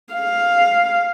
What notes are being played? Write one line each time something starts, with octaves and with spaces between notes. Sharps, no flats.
F5